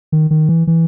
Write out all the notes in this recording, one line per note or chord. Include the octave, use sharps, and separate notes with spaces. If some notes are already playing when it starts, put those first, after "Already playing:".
D#3
D#3
E3
E3